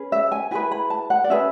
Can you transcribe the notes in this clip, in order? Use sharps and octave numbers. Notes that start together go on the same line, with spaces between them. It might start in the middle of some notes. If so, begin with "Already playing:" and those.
Already playing: C#4 G#4 B4
E5
G#5
E4 G#4 B4 G#5
B5
A5
F#5
D5
C#4 G#4 B4 E5